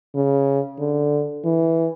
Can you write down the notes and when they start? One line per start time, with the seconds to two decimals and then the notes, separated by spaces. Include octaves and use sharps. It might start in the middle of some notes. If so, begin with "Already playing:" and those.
0.15 C#3
0.79 D3
1.44 E3